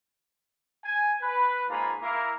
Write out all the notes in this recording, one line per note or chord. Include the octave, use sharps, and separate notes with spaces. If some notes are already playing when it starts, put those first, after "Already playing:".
G#5
B4
G#2 A#3 F4 G#5 A#5 B5
A#3 E4 A#4